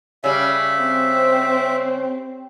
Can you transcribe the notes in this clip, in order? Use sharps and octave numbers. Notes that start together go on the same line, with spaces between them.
C#3 G3 E5
C4